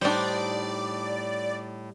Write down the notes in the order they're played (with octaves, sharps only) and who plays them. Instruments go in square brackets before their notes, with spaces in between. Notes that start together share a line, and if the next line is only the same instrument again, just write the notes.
[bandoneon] A2 [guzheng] G3 D#4 [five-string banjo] D4 C5 [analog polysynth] D5